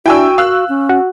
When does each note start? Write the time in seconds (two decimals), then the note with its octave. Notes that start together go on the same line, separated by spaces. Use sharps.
0.06 D4 E4 F#4 G5 G#5 E6
0.38 F5 E6 F#6
0.69 C#4
0.89 F#4